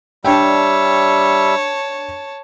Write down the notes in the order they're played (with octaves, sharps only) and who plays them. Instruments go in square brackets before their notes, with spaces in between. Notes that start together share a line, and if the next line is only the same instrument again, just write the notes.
[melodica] G3 E5 [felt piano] D4 G5 [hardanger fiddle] C#5 A5